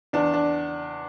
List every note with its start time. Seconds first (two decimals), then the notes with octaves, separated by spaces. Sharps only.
0.13 E2 D4
0.34 D4